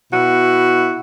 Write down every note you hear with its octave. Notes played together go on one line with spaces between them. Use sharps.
B2 E4 F#4